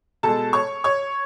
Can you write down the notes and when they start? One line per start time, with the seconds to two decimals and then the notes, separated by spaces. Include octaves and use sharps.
0.23 B2 G#3 A4 A5
0.53 C#5 C#6
0.84 C#5 C#6